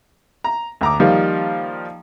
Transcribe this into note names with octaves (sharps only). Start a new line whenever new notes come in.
A#5
D2 A#5 D6
D#3 F3 G3 A#3